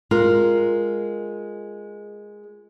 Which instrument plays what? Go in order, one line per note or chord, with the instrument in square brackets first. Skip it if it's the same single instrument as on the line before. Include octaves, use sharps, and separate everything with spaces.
[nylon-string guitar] G#3 F4 A#4